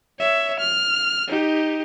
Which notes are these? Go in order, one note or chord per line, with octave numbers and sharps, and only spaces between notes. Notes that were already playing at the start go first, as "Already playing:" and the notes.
C#5 E5
F6
D#4 G4